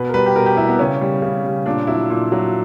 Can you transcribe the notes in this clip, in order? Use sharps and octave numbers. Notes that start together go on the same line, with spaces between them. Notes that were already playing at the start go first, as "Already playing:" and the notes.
Already playing: B2 B4
A#4
G3 B4
G4
B2 A#4
G4
G3 E4
B3
C#3 C#4
G3
C#3
G3
A#2 D4
F#3 E4
A#2
F#3